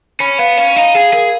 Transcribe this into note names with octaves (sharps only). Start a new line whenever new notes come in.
C#4 B5
B3 F5
C#4 F5
D#4 F5
G#4 F5
G#4 A#4